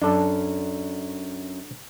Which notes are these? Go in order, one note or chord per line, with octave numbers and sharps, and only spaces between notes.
F#2 D4 A4